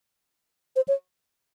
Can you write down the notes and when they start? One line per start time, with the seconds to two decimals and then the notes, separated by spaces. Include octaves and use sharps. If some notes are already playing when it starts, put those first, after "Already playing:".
0.76 C5
0.88 C#5